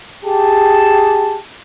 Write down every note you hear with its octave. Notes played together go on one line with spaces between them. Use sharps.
G4 G#4 A5